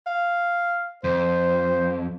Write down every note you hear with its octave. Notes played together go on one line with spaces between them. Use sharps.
F5
F2 C5